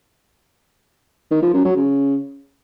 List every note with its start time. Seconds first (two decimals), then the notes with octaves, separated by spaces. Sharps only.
1.31 D#3
1.42 F3
1.53 F#2
1.65 F#3
1.76 C#3